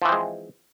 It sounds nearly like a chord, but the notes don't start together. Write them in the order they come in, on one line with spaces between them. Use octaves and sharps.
F3 E3 C4 G#3